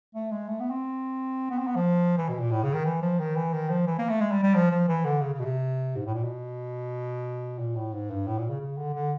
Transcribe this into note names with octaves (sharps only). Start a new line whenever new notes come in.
A3
G#3
A3
B3
C4
B3
C4
B3
F3
E3
B2
A#2
A2
C#3
D#3
E3
F3
D#3
E3
D#3
F3
E3
A#3
A3
G#3
G3
G3
F3
F3
E3
D3
C#3
C#3
B2
C3
G#2
A2
A#2
B2
A#2
A2
G#2
G2
A2
A#2
C#3
C#3
D3
D3